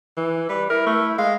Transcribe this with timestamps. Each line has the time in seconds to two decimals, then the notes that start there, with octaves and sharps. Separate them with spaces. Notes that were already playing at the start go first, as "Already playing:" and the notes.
0.17 E3
0.49 G3 B4
0.70 E4 A#4
0.87 A3
1.18 G#3 F5